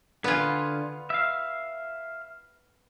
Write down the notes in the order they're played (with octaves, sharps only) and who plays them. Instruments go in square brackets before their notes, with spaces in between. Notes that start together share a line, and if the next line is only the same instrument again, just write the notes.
[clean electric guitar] D3 G#5 [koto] B3 F4
[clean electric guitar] E5 F5